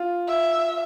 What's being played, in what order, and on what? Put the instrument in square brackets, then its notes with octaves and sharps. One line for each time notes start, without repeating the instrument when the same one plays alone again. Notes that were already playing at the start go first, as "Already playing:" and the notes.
Already playing: [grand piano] F4
[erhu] E5